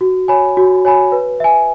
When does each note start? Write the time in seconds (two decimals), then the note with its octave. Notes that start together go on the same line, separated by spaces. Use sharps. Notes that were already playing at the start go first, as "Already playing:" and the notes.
0.01 F#4
0.28 C#5 G#5 B5
0.57 F#4
0.85 C#5 G#5 B5
1.12 B4
1.40 E5 G#5